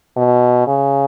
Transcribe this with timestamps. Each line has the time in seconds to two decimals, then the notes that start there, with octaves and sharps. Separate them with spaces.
0.17 B2
0.67 C#3